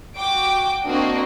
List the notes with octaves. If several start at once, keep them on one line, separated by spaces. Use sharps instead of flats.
F#4 G5 D6 D7
A#3 C4 D4 F#4 D#5